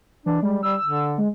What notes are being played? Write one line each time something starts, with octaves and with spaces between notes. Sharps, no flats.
E3 D4
G3 G#3
G3 E6
D3
G#3